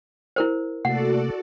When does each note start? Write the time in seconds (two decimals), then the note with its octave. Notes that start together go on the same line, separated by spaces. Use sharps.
0.36 E4 A#4 C5
0.85 C3 A3 A#3 F#4 A4 D5 F#5